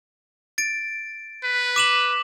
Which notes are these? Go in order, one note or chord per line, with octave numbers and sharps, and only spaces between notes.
A6 D7
B4
D6 E7 F#7